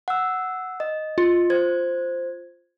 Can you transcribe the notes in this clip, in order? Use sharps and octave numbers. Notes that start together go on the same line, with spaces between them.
F#5 E6
D#5
F4
C5 G#6